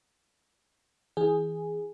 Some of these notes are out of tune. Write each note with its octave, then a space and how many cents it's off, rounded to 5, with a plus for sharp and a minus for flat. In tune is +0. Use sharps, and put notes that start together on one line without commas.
E3 -25 G#4 +0